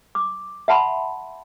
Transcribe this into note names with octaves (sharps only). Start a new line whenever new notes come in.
D6
E5 F#5 A5 B5 C6